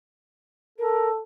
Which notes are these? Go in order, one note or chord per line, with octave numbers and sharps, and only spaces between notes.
A4 A#4